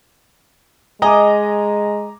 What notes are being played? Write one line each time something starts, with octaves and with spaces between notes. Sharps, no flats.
G#3 D#5 G#5 A#5 D6